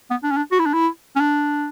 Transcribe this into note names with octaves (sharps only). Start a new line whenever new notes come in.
B3
D4
C#4
D4
F#4
E4
D4
E4
C#4
D4